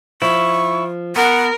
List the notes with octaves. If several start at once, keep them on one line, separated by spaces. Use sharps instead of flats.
F3 E4 C#6
B3 A#4 F#5